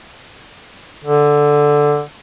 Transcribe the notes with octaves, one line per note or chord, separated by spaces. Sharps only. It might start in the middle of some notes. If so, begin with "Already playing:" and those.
D3